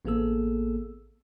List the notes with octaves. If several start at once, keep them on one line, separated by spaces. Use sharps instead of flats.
A1 A#3 B3 G#4 A4 E6